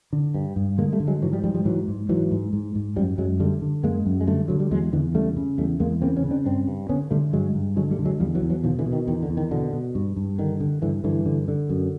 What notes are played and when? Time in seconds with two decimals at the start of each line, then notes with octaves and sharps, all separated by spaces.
0.13 D3
0.34 G2
0.56 G2
0.78 D3 G#3 A#3
0.92 G3 A3
1.00 D3
1.07 F#3 G#3
1.22 G#2 E3 F#3
1.32 F3 G3
1.44 G#2 F3 G3
1.54 F3 G3
1.65 G#2 E3 F#3
1.88 G#2
2.09 G#2 E3 F#3
2.31 G#2
2.53 G#2
2.75 G#2
2.96 F#2 F3 G3
3.18 F#2 F#3 G#3
3.40 D3 G3 A3
3.62 D3
3.83 F#2 G#3 A#3
4.06 F#2
4.21 G#3
4.27 D3 G3 A3
4.48 D3 F#3
4.60 G3
4.71 E2 F#3 G#3
4.93 E2 D3 E3
5.14 C#3 G3 A3
5.37 C#3
5.58 E2 G3 A3
5.80 E2 G#3 A#3
6.02 C#3 A#3 C4
6.16 B3 C#4
6.24 C#3
6.31 C4 D4
6.45 G2 C4 D4
6.68 G2
6.89 D3 B3 C#4
7.11 D3 G3 A3
7.33 G2 F#3 G#3
7.55 G2
7.76 D3 F#3 G#3
7.91 G3 A3
7.99 D3
8.06 F#3 G#3
8.20 E2 F3 G3
8.35 E3 F#3
8.42 E2
8.50 E3 F#3
8.64 B2 D#3 F3
8.78 D3 E3
8.86 B2
8.93 D#3
9.07 E2 D#3
9.22 D3
9.30 E2
9.37 D#3
9.51 B2 D3
9.73 B2
9.95 G2
10.17 G2
10.38 D3 D#3
10.60 D3
10.82 G2 D3 E3
11.04 G2 D3 E3
11.26 D3
11.48 D3
11.69 F#2